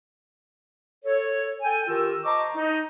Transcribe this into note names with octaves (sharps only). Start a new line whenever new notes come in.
A4 C#5
A4 G5 G#5
D#3 F4 G4 A#4 E6
C5 D#5 A5 A#5 C#6 D6
D#4